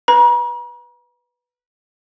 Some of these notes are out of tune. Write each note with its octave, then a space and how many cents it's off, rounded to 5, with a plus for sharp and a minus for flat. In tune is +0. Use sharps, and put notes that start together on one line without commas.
B4 +0 A#5 +45